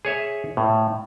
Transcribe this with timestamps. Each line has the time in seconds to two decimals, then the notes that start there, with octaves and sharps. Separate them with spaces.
0.05 G#4 C#5 E5
0.57 A2